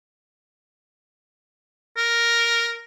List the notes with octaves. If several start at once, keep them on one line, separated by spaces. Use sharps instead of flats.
A#4